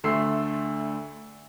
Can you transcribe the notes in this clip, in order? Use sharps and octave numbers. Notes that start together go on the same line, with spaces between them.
D2 D3 A3 C6 E6 C7